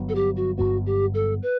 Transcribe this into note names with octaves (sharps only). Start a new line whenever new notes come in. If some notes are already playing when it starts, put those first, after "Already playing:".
Already playing: G1 G2 F#3 B3
A4
G4
F#4
G1 G2 F#3 B3 F#4
G4
A4
B4